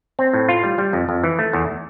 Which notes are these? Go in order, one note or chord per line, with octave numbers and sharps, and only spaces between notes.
C4
A2
F4
G3
G3
F2
F2
E3
A3
E2